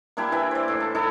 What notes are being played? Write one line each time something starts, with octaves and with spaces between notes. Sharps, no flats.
A#3 D4 E4 G4
E3 E5 G5
C5 D5
A2
A4
D#4 E4 A4